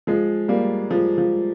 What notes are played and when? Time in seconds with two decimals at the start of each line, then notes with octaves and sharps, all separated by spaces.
0.07 F3 G#3
0.48 G3 A#3
0.91 F3 G#3
1.18 F3